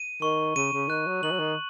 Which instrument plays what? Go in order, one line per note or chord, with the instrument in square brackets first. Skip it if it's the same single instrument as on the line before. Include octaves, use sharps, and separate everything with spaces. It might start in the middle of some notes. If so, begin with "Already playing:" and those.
Already playing: [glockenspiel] D#7
[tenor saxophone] D#3 [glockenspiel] C#6
[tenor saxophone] C#3 [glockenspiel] D#7
[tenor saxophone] C#3
[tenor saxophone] D#3 [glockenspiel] F#6
[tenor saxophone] F#3
[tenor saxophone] D#3 [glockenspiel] F#7
[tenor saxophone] F#3
D#3